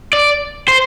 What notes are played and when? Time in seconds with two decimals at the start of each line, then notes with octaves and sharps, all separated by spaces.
0.13 D5
0.68 C5